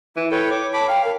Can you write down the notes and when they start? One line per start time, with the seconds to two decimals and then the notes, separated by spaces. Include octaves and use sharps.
0.17 E3 E4
0.32 A4 B4 C#5 G5
0.50 C#5 D6
0.73 A5 B5 D6
0.88 F5 G5
1.05 A#4